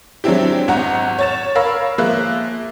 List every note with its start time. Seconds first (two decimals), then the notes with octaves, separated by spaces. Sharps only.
0.24 F#3 G#3 C4 D4 E4 G4
0.68 G#1 F#5 A#5
1.19 C#5 A6 E7
1.55 A#4 C#5 F5 B5 E6
1.98 F3 G#3 A#3 E5 E6 F#6